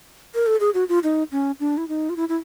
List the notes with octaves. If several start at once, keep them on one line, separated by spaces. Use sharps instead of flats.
A#4
A4
G#4
F#4
F4
D#4
C#4
D4
E4
D#4
F4
E4
E4